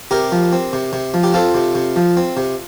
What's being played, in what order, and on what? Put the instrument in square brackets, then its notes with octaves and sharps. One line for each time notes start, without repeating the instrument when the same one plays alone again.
[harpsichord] C3 G4 A#4
F3
C4
C3
C3
F3
G4
C4 F4 A4
C3
C3
F3
C4
C3